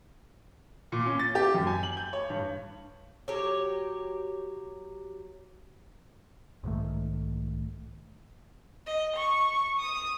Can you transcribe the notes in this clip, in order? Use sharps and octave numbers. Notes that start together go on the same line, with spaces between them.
A#2
C#4
A6
G4
F#2
G#5
F#7
G6
C#5
G2
F#3 G4 C#5
B1 G#2 D#3 A3
D#5
C#6
D#6 D#7